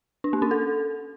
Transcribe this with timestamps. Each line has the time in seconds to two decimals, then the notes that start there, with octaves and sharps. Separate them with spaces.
0.24 D4
0.33 A#3
0.42 C#4
0.51 A4